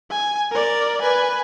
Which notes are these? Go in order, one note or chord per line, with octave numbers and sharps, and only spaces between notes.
G#5
A#4 D5
B4 G#5